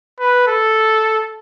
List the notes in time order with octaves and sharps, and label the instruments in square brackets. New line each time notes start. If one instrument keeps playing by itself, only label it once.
[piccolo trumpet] B4
A4